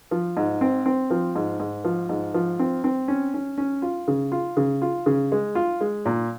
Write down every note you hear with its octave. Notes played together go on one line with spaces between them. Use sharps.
F3
G#2
C4
C4
F3
G#2
G#2
F3
G#2
F3
C4
C4
C#4
C#4
C#4
F4
C#3
F4
C#3
F4
C#3
G#3
F4
G#3
A#2